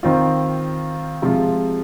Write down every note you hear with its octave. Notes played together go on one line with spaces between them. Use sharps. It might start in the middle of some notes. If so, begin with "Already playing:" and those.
D#3 C4 F4
C3 F3 G#3 F4